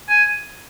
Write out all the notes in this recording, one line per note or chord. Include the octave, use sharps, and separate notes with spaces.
G#5